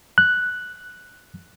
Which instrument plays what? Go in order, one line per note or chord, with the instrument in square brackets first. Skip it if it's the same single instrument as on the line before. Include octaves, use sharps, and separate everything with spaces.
[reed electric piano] F#6